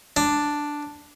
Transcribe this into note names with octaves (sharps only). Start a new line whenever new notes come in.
D4